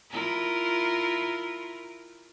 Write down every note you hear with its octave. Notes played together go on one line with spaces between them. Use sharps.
E4 F4 A#4